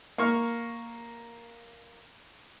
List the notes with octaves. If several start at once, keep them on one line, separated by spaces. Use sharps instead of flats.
A#3 C#6 F6